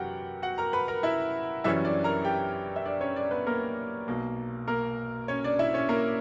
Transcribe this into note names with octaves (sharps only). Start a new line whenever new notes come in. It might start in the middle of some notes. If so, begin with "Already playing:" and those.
Already playing: F#2 E3 F#4 G4 A#4 F#5 G5
F#4 F#5
A#4 A#5
B4 B5
A#4 A#5
E4 E5
F#2 E3 G3 C#4 E4 E5
D4 D5
A#4 A#5
G4 G5
E5
D4 D5
C#4 C#5
D4 D5
B3 B4
A#3 A#4
B1 B2 A#3
A#3 A#4
C#4 C#5
D4 D5
E4 E5
C#4 C#5
A#3 A#4